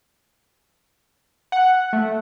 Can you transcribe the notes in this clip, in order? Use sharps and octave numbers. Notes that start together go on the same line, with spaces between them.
F#5
A3